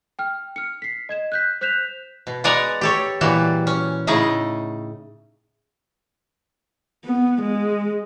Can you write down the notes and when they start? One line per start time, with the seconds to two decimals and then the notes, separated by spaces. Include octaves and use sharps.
0.19 G5 F6
0.56 F6 C#7
0.82 B6 C7
1.09 D#5 G#6 E7
1.32 F#6 G6 B6
1.61 C5 F#6 G6 B6 E7 F7
2.27 B2
2.44 G#3 B3 D5 F#5 G#5 A#5
2.81 G4 A4 C#5
3.21 A#2 E3 G3 F#4 A5
3.67 C#4
4.07 A2 C#3 A3 D#4 E4 G#4
7.05 B3
7.41 G#3